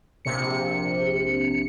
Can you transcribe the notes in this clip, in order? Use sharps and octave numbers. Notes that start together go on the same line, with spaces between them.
A#1 C3 C#7